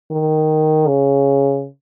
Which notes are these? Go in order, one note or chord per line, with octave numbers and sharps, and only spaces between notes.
D#3
C#3